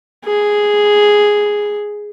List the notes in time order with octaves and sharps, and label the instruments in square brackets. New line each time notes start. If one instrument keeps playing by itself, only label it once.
[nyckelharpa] G#4